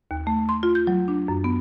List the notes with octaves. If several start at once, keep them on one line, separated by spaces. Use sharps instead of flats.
D#2
A3
C6
F4
G6
F#3
D4
F#2
B3